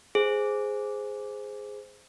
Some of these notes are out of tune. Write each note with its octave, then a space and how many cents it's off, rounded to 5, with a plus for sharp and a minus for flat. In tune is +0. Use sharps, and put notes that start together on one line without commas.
G#4 +0 C5 -5